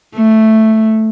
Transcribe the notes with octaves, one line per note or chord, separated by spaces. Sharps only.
A3